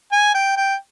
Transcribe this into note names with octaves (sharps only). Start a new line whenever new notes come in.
G#5
G5
G5